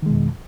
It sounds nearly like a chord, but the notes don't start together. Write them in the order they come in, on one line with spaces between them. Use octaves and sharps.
D#3 G#3 B2 F2